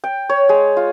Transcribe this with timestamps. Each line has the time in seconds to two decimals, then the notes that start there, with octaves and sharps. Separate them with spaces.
0.04 G5
0.29 C#5
0.49 G#3
0.77 F4